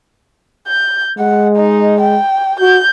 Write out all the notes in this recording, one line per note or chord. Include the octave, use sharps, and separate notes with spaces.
G6
G#3 F#5
D#4
G5
F#4 G6